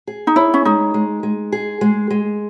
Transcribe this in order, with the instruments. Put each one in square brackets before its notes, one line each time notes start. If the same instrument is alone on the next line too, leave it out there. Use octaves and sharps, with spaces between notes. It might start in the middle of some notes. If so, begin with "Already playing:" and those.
[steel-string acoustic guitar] G#4
[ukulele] D#4
[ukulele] E4 [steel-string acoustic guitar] C#5
[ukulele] C#4
[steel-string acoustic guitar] G#3 [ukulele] D#4
[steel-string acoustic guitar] G#3
G#3
G#4
G#3
G#3